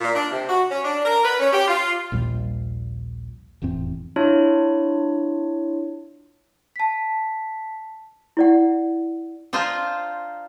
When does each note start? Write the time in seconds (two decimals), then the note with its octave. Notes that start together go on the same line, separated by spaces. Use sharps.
0.01 A#2
0.14 D4
0.31 C3
0.49 F#4
0.70 C#4
0.84 D4
1.05 A#4
1.25 B4
1.40 C#4
1.53 G4
1.68 F4
2.12 A#1 D#2 A#2 G3
3.62 F1 E2 A2 C4
4.16 D4 E4 F4 C#5
6.76 A5 B6
8.37 E4 D5 F#5
9.53 D4 D#4 F4 C5